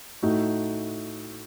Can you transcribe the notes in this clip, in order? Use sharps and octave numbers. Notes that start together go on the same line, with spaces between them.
A2 A3 D#4 F#4